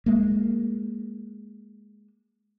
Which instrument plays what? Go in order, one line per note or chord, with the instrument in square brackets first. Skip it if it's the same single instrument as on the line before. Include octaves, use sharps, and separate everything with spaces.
[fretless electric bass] G#3 A#3